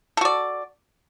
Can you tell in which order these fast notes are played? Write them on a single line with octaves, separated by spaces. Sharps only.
A4 F#4 D5